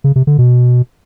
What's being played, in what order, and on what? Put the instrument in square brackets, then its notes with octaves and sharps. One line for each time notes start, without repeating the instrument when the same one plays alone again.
[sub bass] C#3
C3
D3
B2